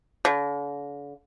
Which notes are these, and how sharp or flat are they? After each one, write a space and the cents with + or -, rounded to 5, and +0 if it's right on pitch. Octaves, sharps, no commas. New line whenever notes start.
D3 -45